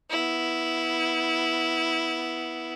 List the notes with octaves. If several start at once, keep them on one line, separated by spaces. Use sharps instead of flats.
B3 E4